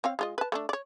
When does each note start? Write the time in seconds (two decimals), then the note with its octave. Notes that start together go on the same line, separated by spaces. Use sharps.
0.04 C4 C#5 F5
0.19 G#3 F4 D#5
0.38 B4 A5
0.52 A3 C#4 D4
0.69 C#5 D5